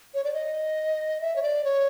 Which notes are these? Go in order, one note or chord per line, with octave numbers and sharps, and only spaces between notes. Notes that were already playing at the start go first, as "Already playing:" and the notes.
C#5
D5
D#5
E5
C#5
D5
C#5